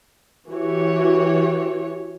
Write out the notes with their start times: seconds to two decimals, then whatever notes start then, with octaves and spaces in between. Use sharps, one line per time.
0.49 E3 F#4 G4 C#5